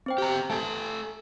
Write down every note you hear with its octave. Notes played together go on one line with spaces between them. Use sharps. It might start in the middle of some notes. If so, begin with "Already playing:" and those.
C4 C5 G5
G4 A#5
A3 A4 G#5 A5